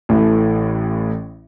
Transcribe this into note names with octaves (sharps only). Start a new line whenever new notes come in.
A1 A2 E3 A3